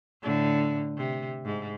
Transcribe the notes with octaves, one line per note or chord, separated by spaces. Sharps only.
A2 D3
C3
G#2